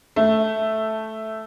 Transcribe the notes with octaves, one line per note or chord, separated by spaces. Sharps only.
A3